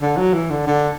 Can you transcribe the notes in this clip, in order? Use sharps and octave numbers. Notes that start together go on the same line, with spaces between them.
D3
F#3
E3
D3
D3